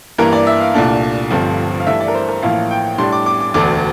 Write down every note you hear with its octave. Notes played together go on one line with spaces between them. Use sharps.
G2 E3 A#3 A#4
D5
E5
F5
C2 A#2 A3 D4
G1 G2 F3 A3 C4
F5
G2 E3 A3 E5
D5
A#4
C5
A#4
A1 A2 F3 A#3 E4 F5
G5
A2 G3 D4 C6
D6
D6
D6
E1 D2 D3 A3 D6